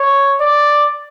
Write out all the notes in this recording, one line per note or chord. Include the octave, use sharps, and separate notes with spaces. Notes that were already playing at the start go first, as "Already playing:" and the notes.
Already playing: C#5
D5